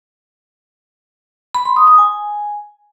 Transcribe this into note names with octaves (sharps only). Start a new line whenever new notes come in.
B5
C6
D#6
D#6
G#5